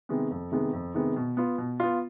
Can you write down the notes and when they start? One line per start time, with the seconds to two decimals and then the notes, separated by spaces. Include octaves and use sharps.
0.09 C3 D#3 G#3 B3
0.31 F2
0.52 C3 D#3 G#3 B3
0.73 F2
0.95 C3 D#3 G#3 B3
1.16 B2
1.37 B3 F4
1.58 B2
1.80 B3 F4